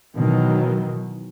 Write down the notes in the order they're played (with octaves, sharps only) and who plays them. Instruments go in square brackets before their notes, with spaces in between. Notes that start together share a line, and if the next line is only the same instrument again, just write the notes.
[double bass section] B2 D#3 E3 F#3